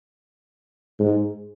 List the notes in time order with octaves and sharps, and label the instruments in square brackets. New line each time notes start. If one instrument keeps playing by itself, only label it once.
[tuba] G#2